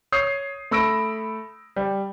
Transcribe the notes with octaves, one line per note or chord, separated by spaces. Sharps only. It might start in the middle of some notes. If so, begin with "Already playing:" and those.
C#5 D#6 G6 C7
A3 B5 E6 A#6 D7
G3